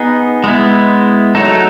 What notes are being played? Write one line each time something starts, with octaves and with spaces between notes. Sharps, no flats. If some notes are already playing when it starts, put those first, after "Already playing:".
Already playing: B3 D#4 G#4
G#3 B3 E4
F#3 A3 D#4 A4